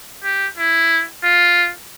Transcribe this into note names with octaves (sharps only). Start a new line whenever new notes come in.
G4
E4
F4